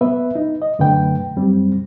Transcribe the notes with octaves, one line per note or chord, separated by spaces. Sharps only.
B3 B4 E5
D#4
D#5
F#2 D3 A3 B4 G5
F#2 G3 C4